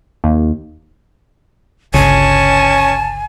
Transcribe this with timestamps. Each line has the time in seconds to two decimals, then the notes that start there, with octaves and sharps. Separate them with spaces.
0.24 D#2
1.94 G1 C#2 C#4 G#5 A5